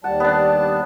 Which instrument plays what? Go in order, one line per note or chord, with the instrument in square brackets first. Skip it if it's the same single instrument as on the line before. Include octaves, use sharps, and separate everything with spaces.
[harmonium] D#2 G3 A5 [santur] F#5
[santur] B3 D4